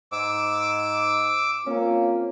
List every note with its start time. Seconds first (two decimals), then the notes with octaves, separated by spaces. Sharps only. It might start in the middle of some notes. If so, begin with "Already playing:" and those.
0.12 G#2 D6 E6
1.66 A#3 C4 C#4 F4